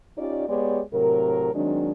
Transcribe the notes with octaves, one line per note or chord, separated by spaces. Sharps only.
C#4 D#4 F4 G4 D5
G#3 B3 G4 C#5 D5
A2 C3 F#3 A#4
D#3 F#3 G#3 C4 D4